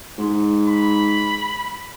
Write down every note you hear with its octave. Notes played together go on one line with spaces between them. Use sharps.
G#2
B5